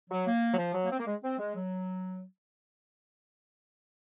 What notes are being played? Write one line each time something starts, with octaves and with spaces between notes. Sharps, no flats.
F#3
A#3
F#3
F3
F#3
A#3
C4
A#3
G#3
C4
G#3
F#3